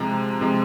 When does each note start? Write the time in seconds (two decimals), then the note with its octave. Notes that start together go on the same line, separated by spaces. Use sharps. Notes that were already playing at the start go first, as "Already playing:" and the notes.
Already playing: C3 F3 G#3 A#5
0.41 C3 F3 G#3